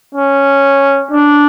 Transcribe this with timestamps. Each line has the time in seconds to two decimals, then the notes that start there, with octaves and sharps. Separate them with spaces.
0.15 C#4
1.11 D4